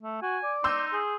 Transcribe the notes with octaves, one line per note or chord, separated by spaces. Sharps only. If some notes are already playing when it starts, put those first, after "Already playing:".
A3
F#4 G#5
D5
D#4 C6 E6 G6
G#4